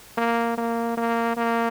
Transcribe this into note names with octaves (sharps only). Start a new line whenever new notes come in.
A#3
A#3
A#3
A#3